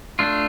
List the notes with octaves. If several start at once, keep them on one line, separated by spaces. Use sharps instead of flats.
A3 D4 F4